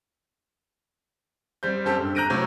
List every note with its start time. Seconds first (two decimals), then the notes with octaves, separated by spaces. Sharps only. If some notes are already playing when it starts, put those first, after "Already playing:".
1.63 G3 C4 G6
1.85 F#2 C4 G4 A4
2.00 G2
2.15 A#5 F#6 G6 A#6 D7 D#7
2.30 A2 C3 F#3 G6